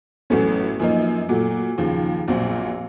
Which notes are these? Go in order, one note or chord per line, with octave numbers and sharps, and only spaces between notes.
A1 A2 F#3 A3 C#4
F#2 F3 A#3 D#4
A#2 F#3 A3
D#2 C#3 F3
A#1 A#2 F#3 C4